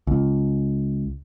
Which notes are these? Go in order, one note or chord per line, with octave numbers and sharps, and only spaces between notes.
C#2